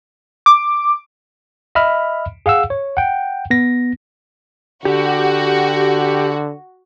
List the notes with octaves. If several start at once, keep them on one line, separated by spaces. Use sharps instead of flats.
D6
D#5 E5 B5 F6
G#4 F5 F#5 E6
C#5
F#5 G5
B3 A#6
D3 F#4 G4